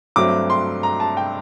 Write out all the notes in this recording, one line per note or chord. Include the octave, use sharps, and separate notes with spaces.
G2 F#3 A3 C4 D6
C6
A#5
A5
G5